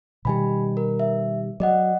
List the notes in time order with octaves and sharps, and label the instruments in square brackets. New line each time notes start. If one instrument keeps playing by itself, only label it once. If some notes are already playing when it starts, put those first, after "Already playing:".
[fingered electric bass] B2 D#3 G3 [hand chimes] G4 G#5 B5
[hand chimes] A#4
E5
[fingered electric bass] F#3 [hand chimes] D5 D#5 F#5